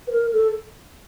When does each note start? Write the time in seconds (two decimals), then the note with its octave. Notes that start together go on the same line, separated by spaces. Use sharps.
0.07 B4
0.12 A#4
0.33 A4